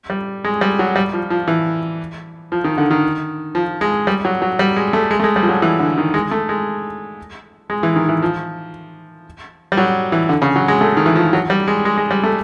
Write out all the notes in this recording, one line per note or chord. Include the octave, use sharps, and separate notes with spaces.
G3
G#3
G3
F#3
G3
F3
F3
E3
F3
D#3
D3
D#3
F3
G#3
G3
F#3
F#3
G3
G#3
A3
G#3
A3
G#3
G3
F3
F#3
E3
D3
D#3
G#3
A3
G#3
G#3
E3
D#3
E3
F3
G3
F#3
E3
D3
C#3
F#3
G#3
A3
D#3
E3
F3
F#3
G3
G#3
G#3
G#3
G3
A3